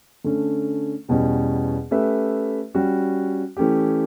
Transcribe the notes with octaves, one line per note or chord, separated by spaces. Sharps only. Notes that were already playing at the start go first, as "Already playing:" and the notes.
D3 A3 C#4
E2 B2 G3 C#4
A3 C#4 G4 B4 E5
G3 C#4 F#4
E3 A3 C#4 G4